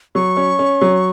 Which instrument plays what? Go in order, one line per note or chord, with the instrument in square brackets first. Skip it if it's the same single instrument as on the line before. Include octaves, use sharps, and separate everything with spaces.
[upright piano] F#3 [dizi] C#6
[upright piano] C#4
C#4
F#3